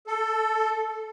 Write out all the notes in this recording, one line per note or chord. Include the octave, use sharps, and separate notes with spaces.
A4